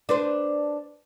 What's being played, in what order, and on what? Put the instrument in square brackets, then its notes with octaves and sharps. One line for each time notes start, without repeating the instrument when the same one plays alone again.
[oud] D4 B4 C5